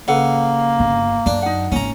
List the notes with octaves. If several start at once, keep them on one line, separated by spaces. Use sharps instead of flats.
C#3 A#3 A4 B4 F#5
G1
F#2 D4
D#4 F#5
G#1 A#3 C#4 A#5